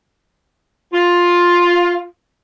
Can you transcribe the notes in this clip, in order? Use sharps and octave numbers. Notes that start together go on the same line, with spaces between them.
F4